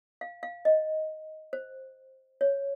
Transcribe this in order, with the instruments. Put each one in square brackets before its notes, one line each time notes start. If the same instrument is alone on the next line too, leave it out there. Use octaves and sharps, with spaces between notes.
[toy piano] F5
F5
D#5
C5
C#5